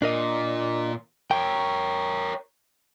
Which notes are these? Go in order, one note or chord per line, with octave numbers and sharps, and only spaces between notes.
A#2 D4 A#4 D#5
A#4 C#5 G5